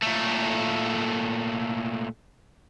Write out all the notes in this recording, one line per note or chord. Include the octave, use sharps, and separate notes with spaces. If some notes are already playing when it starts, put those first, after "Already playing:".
A#2 A3